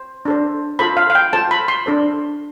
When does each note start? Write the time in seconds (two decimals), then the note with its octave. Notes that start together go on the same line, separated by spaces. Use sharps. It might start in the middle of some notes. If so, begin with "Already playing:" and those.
Already playing: C5
0.25 D4 A4 C5
0.79 F4 A4 C5 B5
0.97 F5
1.10 F5
1.15 G5
1.33 F4 A4 C5 A5
1.51 B5
1.68 C6
1.86 D4 A4 C5